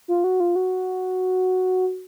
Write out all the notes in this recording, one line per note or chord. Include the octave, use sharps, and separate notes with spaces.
F4
F#4
F4
F#4